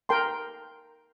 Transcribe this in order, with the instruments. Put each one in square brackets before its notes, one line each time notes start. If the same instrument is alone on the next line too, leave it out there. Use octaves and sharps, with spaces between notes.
[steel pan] A#4 G5 A5 C6